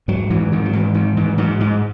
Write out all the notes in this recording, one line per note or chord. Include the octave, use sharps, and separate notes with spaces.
G#2 F#3
G#2 E3
G#2 D#3
F#3
G#2 E3
G#2 D#3
G#2 E3
G#2 F#3
G#2 G#3